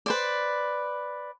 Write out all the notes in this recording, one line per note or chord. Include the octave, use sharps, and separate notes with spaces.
B4 C5 D5